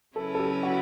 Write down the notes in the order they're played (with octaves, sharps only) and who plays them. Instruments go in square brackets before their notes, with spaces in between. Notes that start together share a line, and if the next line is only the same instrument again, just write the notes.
[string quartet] C#3 F#3 C#4 E4 B4 [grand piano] A4
[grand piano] A4
G4
F#4